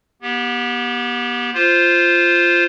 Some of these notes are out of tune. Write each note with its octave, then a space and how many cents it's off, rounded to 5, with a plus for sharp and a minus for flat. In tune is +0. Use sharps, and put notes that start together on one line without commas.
B3 -35 G4 +0
F4 -10 C5 +0